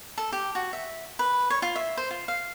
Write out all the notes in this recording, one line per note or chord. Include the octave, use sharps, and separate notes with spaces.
A4
G4
F#4
E5
B4
C#5
F4
E5
C5
F4
F5